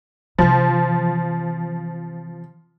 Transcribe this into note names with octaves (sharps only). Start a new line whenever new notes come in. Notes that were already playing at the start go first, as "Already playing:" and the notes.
C3 E3 F3